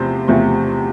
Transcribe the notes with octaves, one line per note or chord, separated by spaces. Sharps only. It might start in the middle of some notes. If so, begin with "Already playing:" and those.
Already playing: E2 C3 F3 A3 C5
E2 C3 F3 A3